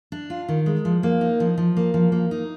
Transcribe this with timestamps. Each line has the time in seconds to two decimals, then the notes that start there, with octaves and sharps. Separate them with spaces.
0.12 D4
0.30 F4
0.48 D#3
0.66 G#3
0.85 F3
1.03 A#3
1.21 D#4
1.40 F3
1.58 F3
1.77 A#3
1.94 F3
2.12 A#3
2.31 D#4